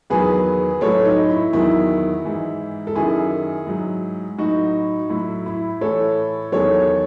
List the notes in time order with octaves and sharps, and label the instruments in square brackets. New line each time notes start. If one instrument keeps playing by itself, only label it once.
[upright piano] E2 D#3 F#3 G#4 B4
A2 F#3 A4 C#5
D#4
E4
E2 D#3 F#3 E4
G#2 E3
A4
F#2 D#3 F#3 E4 G#4
G#2 F#3
A2 F#3 D#4 F#4
A2 F#3 E4
E4
A2 E3 A4 C#5
E2 D#3 F#3 A4 C#5